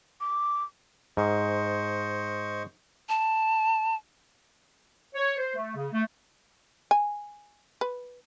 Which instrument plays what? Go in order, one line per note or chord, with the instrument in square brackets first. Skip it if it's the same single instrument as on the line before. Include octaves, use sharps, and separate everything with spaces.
[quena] D6
[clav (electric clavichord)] G#2 [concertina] C5 D#5 C#6
[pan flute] A5
[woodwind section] C#5
C5
A3
C#3
A3
[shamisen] G#5
B4